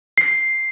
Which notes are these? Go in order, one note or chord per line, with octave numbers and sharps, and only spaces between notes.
C7